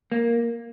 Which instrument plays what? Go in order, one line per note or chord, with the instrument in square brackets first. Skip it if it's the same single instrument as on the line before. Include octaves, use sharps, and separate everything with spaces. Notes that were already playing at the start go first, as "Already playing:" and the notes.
[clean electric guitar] A#3